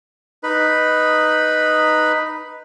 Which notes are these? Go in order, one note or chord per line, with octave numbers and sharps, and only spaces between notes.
D#4 B4 B5